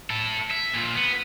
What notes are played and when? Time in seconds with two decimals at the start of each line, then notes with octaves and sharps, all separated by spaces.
0.10 E4 A4
0.50 E5
0.73 A#2 F3
0.95 B3